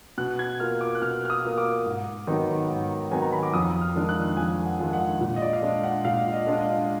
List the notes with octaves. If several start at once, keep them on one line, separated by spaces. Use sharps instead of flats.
B2 F#6
G#6
A#3 F4 F6
D6
F#6
B2 F6
F6
D#6
A#3 F4
D6
G#2
D#3 F#3 B3 D#4
G#2
D#3 F#3 B3 D#4 G#5
A#5
B5
D6
F2 D#6
F6
D#3 G#3 D4 F4
F#6
F2 G#5
F#5
D#3 G#3 D4 F4
F#5
A#2
D#5
D5
F5
G#3 D4 F4 D#5
F#5
A#2 F5
D#5
G#3 D4 F4
D#5